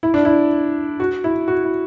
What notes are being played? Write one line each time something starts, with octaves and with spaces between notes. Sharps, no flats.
E4
D4
E4
F#4
E4
F#4
E4